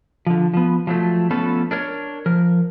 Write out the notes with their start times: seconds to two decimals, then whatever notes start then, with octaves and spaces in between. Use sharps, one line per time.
0.26 D3 F3
0.54 F3 B3
0.87 F3 F#3 A3
1.31 F3 A3 B3 C#4 A4
1.71 D4 A#4 C#5
2.26 F3 A#4